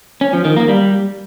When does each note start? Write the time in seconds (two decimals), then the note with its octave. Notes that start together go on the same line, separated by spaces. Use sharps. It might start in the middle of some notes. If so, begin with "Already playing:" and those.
0.21 C#4
0.33 F3
0.45 D#3
0.57 A#3
0.68 G3